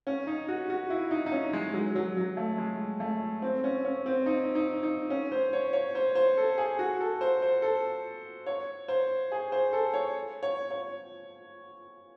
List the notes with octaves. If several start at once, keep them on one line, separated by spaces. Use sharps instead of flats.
C#4
D#4
F#4
F#4
E4
D#4
D#4
C#4
G#3
F#3
F#3
F#3
A3
G#3
A3
C4
C#4
C#4
C4
D#4
D#4
D#4
C#4
C5
C#5
C#5
C5
C5
A4
G#4
F#4
A4
C5
C5
A4
C#5
C5
G#4
C5
A4
C#5
C#5
C#5